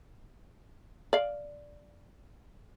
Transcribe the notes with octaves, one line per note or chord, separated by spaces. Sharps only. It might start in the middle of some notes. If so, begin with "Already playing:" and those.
D5 F5